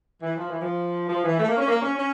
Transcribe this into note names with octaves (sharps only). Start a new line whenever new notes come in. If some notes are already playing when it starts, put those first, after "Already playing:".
E3
F3
E3
F3
F3
E3
A3
A#3
C#4
A#3
C#4
C#4